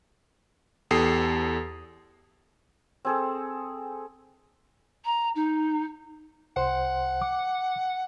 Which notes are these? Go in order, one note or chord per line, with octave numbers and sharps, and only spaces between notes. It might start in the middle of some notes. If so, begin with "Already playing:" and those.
E2 G4 A4 D#6 C7
C4 G#4 A4
A#5
D#4
C2 C5 F#5 C6
D6